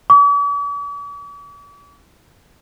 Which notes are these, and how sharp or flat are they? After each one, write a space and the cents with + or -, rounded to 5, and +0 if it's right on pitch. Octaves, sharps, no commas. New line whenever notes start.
D6 -45